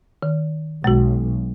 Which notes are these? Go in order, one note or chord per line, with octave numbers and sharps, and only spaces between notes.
D#3
B1 G#3 F#4